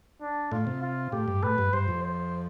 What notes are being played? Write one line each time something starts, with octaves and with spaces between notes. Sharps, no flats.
D4
A2 F4
C3
F4
A2 G4
G2
A2 B4
G2
G2 C5
F2
C5